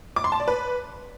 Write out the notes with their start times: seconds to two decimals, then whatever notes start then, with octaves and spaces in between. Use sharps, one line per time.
0.16 D6
0.24 C6
0.32 A5
0.40 D5
0.48 B4